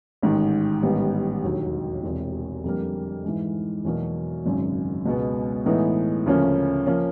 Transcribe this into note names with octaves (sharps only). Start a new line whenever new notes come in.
A1 G#2 D#3
A1 G#2 D#3 G3 B3
E1 D#2 D3 F#3
E1 E2 C3
F2 D3 G3 A#3
G#2 E3 G#3
E2 B2 F#3 A#3
G#1 F#2 C#3
C#2 B2 G#3 B3
A2 E3 G#3 B3 D#4
D2 C#3 F3 A#3 C#4
F3 A#3 C#4